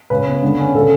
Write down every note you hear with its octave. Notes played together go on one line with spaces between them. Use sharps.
C#3 B4
B3
D3
C#4
C#3 A4